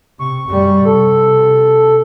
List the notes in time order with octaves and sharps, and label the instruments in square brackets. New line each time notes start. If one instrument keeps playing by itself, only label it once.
[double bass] C3 [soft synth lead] C#6
[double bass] F#2 G3
[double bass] C3 [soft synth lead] A4